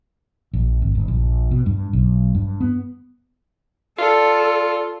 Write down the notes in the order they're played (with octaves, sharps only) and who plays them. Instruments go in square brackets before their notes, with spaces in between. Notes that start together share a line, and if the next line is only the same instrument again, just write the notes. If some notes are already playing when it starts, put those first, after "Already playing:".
[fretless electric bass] A#1
G#1
G1
A#1
B2
G2
B1
G2
B3
[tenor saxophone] F4 [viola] A4 [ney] D5